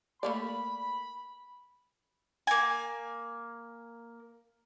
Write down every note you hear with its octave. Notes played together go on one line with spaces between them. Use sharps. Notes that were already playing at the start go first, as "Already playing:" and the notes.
A3 A#3 D5 B5
A#3 G#5